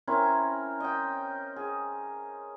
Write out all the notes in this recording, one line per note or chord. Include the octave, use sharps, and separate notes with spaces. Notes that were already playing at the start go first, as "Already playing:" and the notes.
C4 C#4 E4 A#4
D#5 G5
G#4